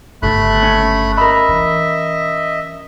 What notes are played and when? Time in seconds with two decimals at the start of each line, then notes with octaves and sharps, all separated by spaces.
0.22 G1 C#3 A3 B5 F#6
0.62 C#4
1.17 A#4 D#5 E5 B5
1.49 E3